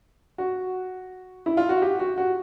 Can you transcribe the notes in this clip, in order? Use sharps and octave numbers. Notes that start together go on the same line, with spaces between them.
F#4
E4
F4
F#4
G4
F#4
F#4